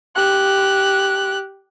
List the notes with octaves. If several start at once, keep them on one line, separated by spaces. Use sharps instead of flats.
G4 F#6